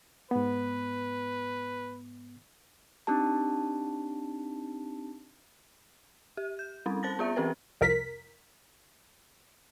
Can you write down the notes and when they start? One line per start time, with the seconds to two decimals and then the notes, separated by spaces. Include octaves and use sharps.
0.31 G#2 B3 B4
3.07 C4 D4 D#4 G4 A5
6.37 G4
6.59 G6
6.86 G3 C4 C#4
7.03 C5 A5 A6 A#6
7.19 B3 F4 E5
7.36 E3 C4 G4 A#4 B4
7.81 C2 F2 A#4 B6